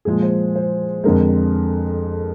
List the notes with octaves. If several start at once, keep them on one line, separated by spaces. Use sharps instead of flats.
A#2 F3 G#3 G#4
C5
C5
F2 D3 G#3 A#4